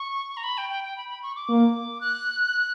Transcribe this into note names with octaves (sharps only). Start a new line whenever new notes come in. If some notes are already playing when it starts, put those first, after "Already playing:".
Already playing: C#6
A#5
B5
G5
G5
G5
B5
B5
C#6
D6
A#3
F#6